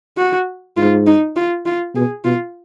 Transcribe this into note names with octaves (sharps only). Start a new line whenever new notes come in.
F#4
G#2 F4
D#4
F4
F4
B2 G#4
B2 F4